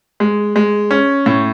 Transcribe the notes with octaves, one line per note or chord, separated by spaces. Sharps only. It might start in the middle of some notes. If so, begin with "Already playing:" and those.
G#3
G#3
C#4
A2